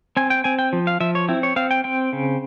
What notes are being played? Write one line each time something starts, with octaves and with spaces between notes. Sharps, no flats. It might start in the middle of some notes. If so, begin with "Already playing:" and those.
C4 G#5
G5
C4 G#5
G5
F3
F5
F3 E5
C#5
C4 E4
C#5
C4 F5
G5
C4 G5
C#3